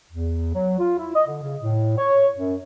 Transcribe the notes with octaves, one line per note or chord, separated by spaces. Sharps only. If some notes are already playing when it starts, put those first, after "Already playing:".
E2
F#3
F4
E4
D#5
D3
C#3
A2
C#5
F#2